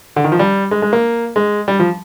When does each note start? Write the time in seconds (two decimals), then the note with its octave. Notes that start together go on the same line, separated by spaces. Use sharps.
0.16 D3
0.24 D#3
0.32 F3
0.39 G3
0.71 G#3
0.82 G#3
0.93 A#3
1.36 G#3
1.68 G3
1.79 F3